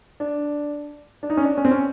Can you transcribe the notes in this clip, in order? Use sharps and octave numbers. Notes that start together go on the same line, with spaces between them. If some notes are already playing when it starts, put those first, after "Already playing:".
D4
D4
D#4
C#4
D4
C#4
C4
C#4